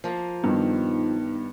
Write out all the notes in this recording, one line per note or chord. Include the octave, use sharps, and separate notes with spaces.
F3 A#3
G2 D#3 B3 D#4